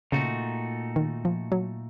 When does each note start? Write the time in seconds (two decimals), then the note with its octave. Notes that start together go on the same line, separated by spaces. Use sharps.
0.12 A#2 C#3 A3 D#4 F#4
0.96 D#3
1.25 F3
1.52 F#3